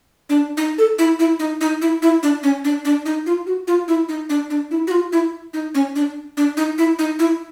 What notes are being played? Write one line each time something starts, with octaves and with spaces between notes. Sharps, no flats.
D4
D#4
A4
E4
E4
D#4
D#4
E4
E4
D4
C#4
D4
D4
D#4
F4
F#4
F4
E4
D#4
D4
D4
E4
F#4
F4
E4
D#4
C#4
D4
D4
D#4
E4
D#4
E4